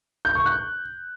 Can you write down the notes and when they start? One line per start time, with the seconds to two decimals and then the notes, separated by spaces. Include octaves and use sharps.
0.25 G6
0.35 C#6
0.46 F#6